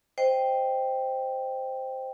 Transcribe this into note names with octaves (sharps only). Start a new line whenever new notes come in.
C5 D#5 G5